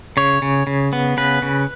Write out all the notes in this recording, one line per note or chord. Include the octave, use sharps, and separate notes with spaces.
C#3 C#5
C#3
C#3
B3
C#3 B4
C#3